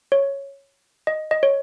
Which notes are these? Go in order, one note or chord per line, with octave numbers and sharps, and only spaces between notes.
C#5
D#5
D#5
C#5